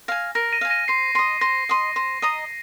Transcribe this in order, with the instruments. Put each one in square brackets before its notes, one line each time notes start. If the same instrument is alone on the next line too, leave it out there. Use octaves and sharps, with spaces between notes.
[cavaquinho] F5 G#5 [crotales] A#6
[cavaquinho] A#4 [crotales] A#6
[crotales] A#6 D#7
[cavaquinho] F5 G#5
[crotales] A#6 D#7
[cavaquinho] C5 [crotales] C7
[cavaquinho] D#5 C6
[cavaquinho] C5 [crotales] A#6
[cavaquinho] D#5 C6
C5
D#5 A#5 D#6